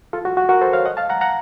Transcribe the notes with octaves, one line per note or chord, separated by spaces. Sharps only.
F4 A4
F#4
F#4
F#4 A#4
A4 C5
C#5 F5
D#5 F#5
F5 A5
F#5 A#5
F#5 A#5